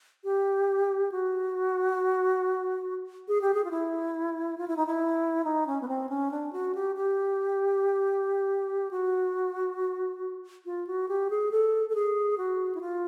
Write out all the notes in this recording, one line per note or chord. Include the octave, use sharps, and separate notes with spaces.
G4
F#4
G#4
G4
G#4
F4
E4
F4
E4
D#4
E4
D#4
C#4
B3
C4
C#4
D4
F#4
G4
G4
F#4
F4
F#4
G4
G#4
A4
A4
G#4
F#4
E4
F4